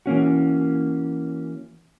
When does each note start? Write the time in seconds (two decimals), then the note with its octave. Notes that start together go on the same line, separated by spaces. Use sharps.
0.06 E3 A#3 C#4 F#4